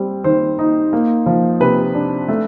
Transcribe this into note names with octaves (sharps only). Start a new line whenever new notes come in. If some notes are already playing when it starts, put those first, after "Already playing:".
Already playing: G3 C4
D#3 C5
D#4
A#3
F3
C3 B4
D4
A3